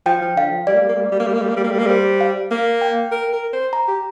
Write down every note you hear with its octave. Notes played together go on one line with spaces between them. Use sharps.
F3 G5
F3
D3 F5
F3
G3 D5
A#3
G3
A#3
G3
A#3
G3
A#3
G3
A#3
G3
A#3
G3
A#3
G3
A#3
G3 C5
F5
A#3 F5
G5
A#4
A#4
C5
A#5
G4